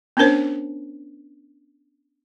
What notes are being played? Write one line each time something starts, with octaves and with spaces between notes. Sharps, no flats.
B3 C#4 D4 A#4 C5 C#5